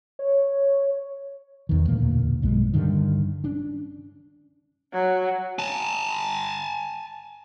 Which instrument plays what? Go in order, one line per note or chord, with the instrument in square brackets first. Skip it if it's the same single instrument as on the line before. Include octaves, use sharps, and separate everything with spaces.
[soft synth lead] C#5
[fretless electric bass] E2 D#3
E1 D2 A#2 A#3
B1 G2 F#3 G#3
G2 D3 D#3
C#4 D4
[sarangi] F#3
[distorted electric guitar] G#5 A5